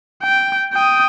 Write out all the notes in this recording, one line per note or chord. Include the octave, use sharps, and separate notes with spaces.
G5
G5 D#6